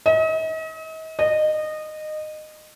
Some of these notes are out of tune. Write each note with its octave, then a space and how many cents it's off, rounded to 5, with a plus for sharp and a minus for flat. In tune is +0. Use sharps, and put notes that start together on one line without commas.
D#5 +40
D#5 -20